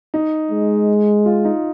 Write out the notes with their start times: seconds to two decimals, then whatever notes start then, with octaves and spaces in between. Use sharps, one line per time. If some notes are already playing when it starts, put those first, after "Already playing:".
0.14 D#4
0.51 G#3
1.25 F4
1.45 D#4